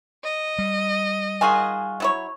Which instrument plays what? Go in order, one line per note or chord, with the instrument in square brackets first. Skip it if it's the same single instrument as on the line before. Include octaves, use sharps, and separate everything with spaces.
[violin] D#5
[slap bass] G3
[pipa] D#3 F4 F#4 [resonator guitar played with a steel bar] G#4 G#5
[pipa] F#3 E4 C#5